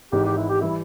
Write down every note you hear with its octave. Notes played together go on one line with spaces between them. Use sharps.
G#1 G#2 E3 G4
G4
E4
G4
E3 G3 E4